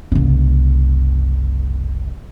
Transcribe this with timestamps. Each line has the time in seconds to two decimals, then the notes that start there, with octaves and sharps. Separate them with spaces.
0.12 F#1 C2